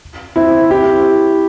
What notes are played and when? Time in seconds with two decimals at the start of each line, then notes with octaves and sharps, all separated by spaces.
0.36 C4 E4
0.71 E4 G4